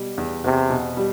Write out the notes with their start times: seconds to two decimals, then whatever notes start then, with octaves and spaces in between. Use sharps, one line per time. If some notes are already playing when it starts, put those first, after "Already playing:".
Already playing: B2 G3
0.18 E2
0.44 E2 C3
0.70 B2
0.97 G3